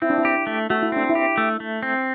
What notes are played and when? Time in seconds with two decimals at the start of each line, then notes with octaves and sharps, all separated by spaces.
0.02 C4 E4
0.10 D4
0.18 E4
0.25 G4
0.47 A3
0.70 A3 F#4
0.83 E4
0.92 C4 D4
1.09 E4
1.15 G4
1.38 A3
1.60 A3
1.83 C4